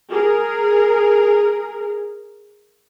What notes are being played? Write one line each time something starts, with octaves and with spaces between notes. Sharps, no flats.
G#4 A#4